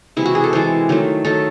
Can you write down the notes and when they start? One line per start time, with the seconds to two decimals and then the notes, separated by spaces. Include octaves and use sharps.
0.17 C3 E3 G#3 E4
0.26 F#4
0.35 G#4
0.44 A4
0.53 C3 E3 G#3 C5
0.89 D#3 F#3 A3
1.25 D#3 F#3 A3 A4